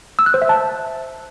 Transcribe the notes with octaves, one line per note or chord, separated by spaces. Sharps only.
E6
F#6
C5
E5
A5